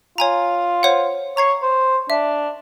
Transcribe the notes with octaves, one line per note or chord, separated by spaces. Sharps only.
F4 C#5 G#5 A#5
C5 C#5 F#5
C#5 A#5 G#6 C7
C5
D4 E5